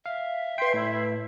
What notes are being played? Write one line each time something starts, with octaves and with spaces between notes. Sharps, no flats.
E5 F5
B4 G5 C6 B6 C7
A2 E4